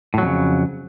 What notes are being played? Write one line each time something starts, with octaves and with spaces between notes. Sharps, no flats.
F2 A2 C#3 F#3